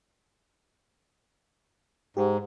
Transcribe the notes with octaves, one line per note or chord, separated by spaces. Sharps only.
G#2 G4